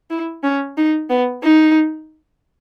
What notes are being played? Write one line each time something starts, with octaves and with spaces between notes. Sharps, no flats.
E4
C#4
D#4
B3
D#4